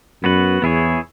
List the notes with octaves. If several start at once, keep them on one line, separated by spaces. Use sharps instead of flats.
F#2 B3 F#4 B4
E2 B3 E4 G#4 C#5